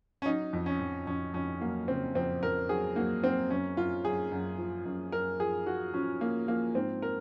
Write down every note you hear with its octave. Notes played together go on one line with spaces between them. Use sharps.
C#4
F#3 D#4
F2
C#4
F2
F2 C#4
F2 C#4
F#3 A#3
C#3 C4
F2 C4
F2 A#4
F#3 G#4
F#3 A#3
F#3 C4
F#2 C#4
F#2 F4
F#2 G#4
F#2
F3
F#2
F#2 A#4
F3 G#4
F3 F#4
F3 C#4
F3 A#3
F3 A#3
G#2 C4
A#4